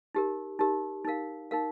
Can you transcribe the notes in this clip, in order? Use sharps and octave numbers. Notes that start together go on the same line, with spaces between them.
D#4 G4 A#4
D#4 G4 A#4
D#4 A#4 F5
D#4 A#4 F5